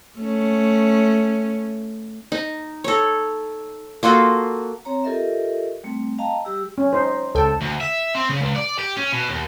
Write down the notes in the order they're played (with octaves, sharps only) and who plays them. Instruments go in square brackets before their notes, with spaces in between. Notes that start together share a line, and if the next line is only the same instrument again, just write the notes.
[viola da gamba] A3 C#4
[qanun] D#4
A4 C#5
A#3 F4 F#4 A4
[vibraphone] C4 C#5 A#5
F4 G4 A4 A#4 D#5 E5
G3 A3 C4
D#5 F5 G5 A5 A#5
G3 G4 E6
[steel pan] C#4
D#4 C5
[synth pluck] C#2 G5 [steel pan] A4
[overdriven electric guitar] D2
E5
C4
C#3
C#2
D5
G4
C#4
B2
D#2